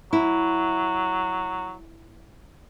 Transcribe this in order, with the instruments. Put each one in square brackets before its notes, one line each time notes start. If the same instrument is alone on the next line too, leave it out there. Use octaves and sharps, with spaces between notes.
[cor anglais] F#3 [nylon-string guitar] E4